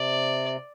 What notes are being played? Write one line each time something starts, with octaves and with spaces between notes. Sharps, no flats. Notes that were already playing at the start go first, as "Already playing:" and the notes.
Already playing: C3 D5